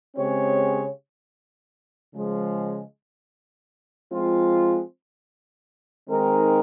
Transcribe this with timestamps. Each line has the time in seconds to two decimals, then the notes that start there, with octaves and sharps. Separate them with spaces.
0.17 C#3 G#3 C4 G4 C#5
2.13 C#3 F3 G#3
4.10 F3 G#3 C4 F4
6.08 D#3 G#3 C4 D#4 A#4